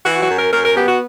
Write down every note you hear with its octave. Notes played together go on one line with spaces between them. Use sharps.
E3 F#4
F#4
F#2
A#4
F#2 A#4
A#4
B3 G4
F#4